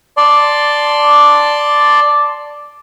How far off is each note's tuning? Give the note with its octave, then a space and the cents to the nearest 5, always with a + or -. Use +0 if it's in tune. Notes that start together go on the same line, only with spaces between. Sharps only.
D5 +0 A5 +0 C6 +0